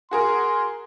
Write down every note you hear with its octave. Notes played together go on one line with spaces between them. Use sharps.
F#4 G#4 A#4 C6